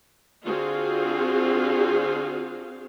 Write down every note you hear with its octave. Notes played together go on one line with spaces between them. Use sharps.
D3 C4 F4 F#4 G#4 F5